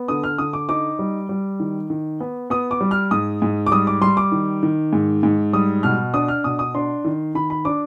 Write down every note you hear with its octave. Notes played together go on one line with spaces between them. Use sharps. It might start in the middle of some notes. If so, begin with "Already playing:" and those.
Already playing: B3
D3 D#6
F6
D3 D#6
D6
D#4 D6
G3
G3
D#3
D#3
B3
B3 D#6
D6
G3
F6
G#2 D#6
G#2
D6
G3 D#6
D6
G3 C6
D6
D#3
D#3
G#2
G#2
G3 D#6
B2 F6
D4 D#6
F6
B2 D#6
D#6
D4 C6
D#3
D#3 B5
B5
D4 D6